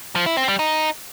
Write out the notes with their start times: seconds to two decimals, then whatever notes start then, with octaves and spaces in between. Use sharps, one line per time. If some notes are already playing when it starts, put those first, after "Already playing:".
0.15 F3
0.26 E4
0.37 C4
0.48 G3
0.59 D#4